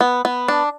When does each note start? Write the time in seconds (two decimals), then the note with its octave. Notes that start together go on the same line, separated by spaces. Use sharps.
0.01 B3
0.25 B3
0.48 D4